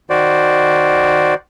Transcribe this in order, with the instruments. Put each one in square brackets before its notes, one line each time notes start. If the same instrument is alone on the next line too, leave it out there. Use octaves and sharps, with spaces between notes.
[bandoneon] D#3 F#4 C5 D5